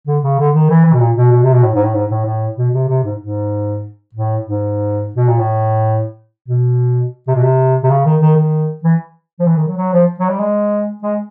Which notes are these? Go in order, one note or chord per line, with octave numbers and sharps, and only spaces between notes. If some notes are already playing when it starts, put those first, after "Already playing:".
D3
C#3
D3
D#3
E3
E3
B2
A#2
B2
B2
C3
B2
A2
G#2
A2
G#2
A2
A2
B2
C3
C3
G#2
G#2
A2
G#2
B2
A#2
A2
B2
C3
B2
C3
C3
C#3
D#3
D#3
D#3
E3
F3
E3
D#3
F#3
F#3
F3
F#3
G3
G#3
G#3